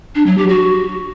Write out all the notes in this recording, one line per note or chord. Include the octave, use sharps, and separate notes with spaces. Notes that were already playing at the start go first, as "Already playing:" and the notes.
D4
F#3
G4
F#4